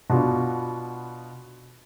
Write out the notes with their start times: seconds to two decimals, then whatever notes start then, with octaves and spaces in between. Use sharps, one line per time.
0.10 B2 B3 D4 F4 F#4